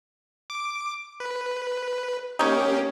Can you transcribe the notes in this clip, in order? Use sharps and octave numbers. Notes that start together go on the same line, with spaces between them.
D6
B4
A#3 C#4 D#4 G4 C#5